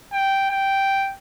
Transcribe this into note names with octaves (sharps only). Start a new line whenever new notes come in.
G5
G5